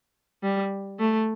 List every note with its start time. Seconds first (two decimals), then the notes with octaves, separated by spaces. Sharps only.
0.43 G3
1.00 A3